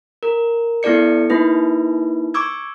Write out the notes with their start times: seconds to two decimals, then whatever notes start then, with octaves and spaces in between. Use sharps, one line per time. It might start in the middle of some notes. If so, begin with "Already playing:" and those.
0.23 A#4
0.83 B3 E4 A4 D5 C#7
1.30 A#3 D#4 E4 B4
2.34 C#6 D6 E6 G#6